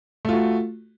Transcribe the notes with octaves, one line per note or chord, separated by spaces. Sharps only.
A3 F4 F#4